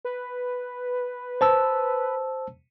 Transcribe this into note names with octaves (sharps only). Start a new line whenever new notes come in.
B4
C5 A5 E6